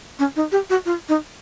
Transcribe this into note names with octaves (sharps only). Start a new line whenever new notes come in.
C#4
D#4
G4
F#4
F4
D#4